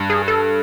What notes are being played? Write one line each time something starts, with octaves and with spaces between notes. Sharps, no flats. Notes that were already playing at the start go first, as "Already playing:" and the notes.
Already playing: G2
G#4
A4